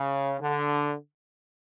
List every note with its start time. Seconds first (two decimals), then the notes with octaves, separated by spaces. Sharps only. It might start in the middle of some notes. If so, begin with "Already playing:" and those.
Already playing: C#3
0.41 D3